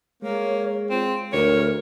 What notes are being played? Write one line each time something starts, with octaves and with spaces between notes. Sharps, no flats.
G#3 A#3 C#5
C4 F4
D2 A#4 C#5